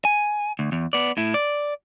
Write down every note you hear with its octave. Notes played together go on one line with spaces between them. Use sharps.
G#5
D2
E2
B3 D5
A2 E4
D5